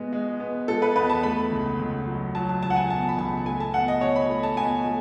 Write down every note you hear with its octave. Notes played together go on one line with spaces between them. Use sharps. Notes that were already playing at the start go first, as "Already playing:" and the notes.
Already playing: B2 G#3 B3
G#3
B3
G#3 A4
B4
E2 B4
A5
A3 B5
C#2
C#2
F#3
F#3 A5
A5
C#2 A5
F#5
G#5
B2 A5
B5
C#2 A5
A3 G#5
A5
B2 F#5
D#5
B2 C#5
B5
A3
A5
B2 G#5
A3